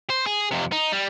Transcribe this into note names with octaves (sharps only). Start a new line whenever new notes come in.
C5
G#4
F2 C3
D#4
G3